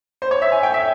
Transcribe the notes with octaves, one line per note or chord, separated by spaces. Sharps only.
C5
C#5
E5
G#5
G5
E5